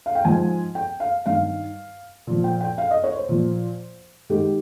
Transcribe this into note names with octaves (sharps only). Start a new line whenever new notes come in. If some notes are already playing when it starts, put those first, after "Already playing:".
F5
G5
G#2 F3 G#5
G5
F5
G2 D#3 F5
A#2 F3
G5
G5
F5
D#5
C#5
C5
A#2 F3
G#2 D#3 G4